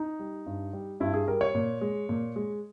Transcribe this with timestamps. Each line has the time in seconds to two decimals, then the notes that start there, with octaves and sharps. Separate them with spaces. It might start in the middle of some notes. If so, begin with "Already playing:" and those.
Already playing: D#4
0.19 G3
0.46 G2
0.73 G3
1.00 G2 E4
1.14 G#4
1.28 G3 A#4
1.41 C#5
1.55 A#2
1.81 G#3
2.09 A#2
2.36 G#3